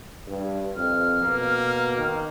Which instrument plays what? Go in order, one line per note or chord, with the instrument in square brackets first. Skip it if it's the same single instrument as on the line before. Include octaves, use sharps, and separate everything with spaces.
[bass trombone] G2
[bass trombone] F2 [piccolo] F6
[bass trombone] B2 [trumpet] A#3
[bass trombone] D#3